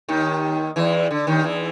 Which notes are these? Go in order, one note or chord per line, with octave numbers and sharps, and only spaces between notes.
D#2 D#3
E2 E3
D3
D#2 D#3
E2 E3